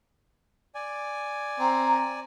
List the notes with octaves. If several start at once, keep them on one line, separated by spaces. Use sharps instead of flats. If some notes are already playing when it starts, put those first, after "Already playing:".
D5 G#5
C4 A#5